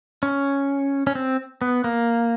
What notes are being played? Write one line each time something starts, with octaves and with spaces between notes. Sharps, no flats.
C#4
C#4
C4
B3
A#3